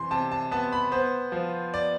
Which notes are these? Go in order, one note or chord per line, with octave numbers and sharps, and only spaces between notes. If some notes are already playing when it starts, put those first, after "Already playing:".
Already playing: C3 E3 C6
C3 A5
A5
B3 A5
B5
B3 C5
F3
D5